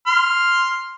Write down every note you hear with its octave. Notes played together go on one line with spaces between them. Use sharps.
C6 F6